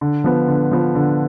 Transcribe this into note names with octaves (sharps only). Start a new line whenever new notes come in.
D3
F3 B3
D3
F3 B3
D3